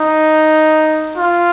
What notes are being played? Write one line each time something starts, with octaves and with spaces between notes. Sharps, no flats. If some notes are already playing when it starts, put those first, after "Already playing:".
Already playing: D#4
F4